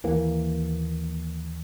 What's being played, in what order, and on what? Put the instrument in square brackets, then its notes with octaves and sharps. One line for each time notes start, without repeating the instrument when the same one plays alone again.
[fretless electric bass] D#2 E3 A#3